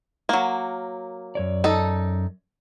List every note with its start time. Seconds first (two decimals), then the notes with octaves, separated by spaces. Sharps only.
0.29 F#3 A#3
1.35 F#2 C#5 D5
1.64 D#4 A4